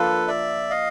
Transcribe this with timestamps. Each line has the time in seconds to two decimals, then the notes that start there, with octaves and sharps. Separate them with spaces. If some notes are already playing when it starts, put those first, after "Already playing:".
Already playing: F3 A#3 D4 F4 A4 B4
0.27 D5 E5
0.70 D#5 F5